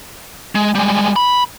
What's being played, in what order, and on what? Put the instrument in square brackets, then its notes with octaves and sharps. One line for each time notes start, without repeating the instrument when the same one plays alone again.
[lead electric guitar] G#3
G3 G#3
B5